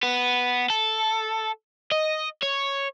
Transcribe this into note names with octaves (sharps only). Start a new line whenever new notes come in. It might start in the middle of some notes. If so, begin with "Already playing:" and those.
B3
A4
D#5
C#5